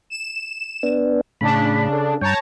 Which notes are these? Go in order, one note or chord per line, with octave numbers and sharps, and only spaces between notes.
E7
B3 D4
A2 C#3 D4 B5
A4
G2 C#5 G5 A5 A#5